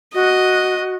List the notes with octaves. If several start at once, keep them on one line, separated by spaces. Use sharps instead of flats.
F#4 D#5